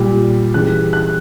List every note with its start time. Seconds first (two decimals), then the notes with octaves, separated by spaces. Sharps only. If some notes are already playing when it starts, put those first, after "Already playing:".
Already playing: A#2 G3
0.54 C#3 E3 G3 F#6
0.93 F#6